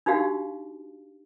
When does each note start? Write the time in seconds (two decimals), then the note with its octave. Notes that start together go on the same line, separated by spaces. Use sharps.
0.06 D4 D#4 F#4 G4 F5